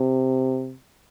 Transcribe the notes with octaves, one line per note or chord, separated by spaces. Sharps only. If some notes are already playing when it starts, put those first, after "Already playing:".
Already playing: C3